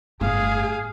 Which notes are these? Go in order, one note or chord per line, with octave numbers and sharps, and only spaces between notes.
G1 A2 A3 G#4 F5